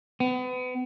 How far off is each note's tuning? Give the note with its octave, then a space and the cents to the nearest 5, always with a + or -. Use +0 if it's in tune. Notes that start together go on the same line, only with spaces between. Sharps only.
B3 +35